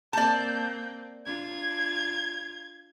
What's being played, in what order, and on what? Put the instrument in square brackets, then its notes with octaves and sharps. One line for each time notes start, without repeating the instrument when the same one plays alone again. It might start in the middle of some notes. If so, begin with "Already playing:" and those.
[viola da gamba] A#3 C4 [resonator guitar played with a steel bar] D5 A5 [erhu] G6
[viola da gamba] D4 F4 [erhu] G#6